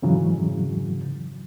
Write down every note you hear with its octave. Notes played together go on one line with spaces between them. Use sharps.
F2 G#2 C#3 E3 F#3